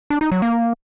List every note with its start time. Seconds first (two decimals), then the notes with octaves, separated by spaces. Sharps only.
0.10 D4
0.21 D#4
0.32 F#3
0.42 A#3